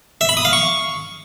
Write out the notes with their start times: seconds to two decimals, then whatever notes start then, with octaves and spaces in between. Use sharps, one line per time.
0.21 E5
0.29 B5
0.37 D#6
0.45 F5
0.53 C#6